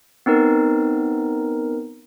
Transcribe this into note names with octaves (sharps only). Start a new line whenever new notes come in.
B3 C4 D#4 A#4